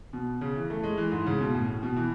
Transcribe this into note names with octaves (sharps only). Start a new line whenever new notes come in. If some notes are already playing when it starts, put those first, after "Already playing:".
B2
C#3
E3
A3
G#3
E3
G#2
C#3
B2
A2
B2
E3